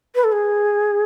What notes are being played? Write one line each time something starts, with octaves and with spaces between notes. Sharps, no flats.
B4
A4
G#4